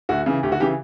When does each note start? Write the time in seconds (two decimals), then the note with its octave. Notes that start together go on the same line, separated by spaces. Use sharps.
0.09 D2 F#4
0.26 C#3 E3
0.43 D2 G4
0.52 F#4
0.60 C#3 E3 G4